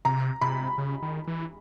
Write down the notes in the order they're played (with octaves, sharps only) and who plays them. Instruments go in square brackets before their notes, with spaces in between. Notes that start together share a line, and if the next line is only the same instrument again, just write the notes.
[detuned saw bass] C3 [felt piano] A#5
[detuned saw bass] C3 [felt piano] B5
[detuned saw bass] C#3
D#3
E3